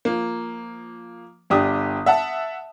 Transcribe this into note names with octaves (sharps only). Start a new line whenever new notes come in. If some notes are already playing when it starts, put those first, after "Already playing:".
F3 A#3
G1 D4 G4 D#6
E5 F#5 A5